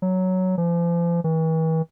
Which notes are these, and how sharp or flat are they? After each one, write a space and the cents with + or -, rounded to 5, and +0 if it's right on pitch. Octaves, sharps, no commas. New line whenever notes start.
F#3 +5
F3 -40
E3 -40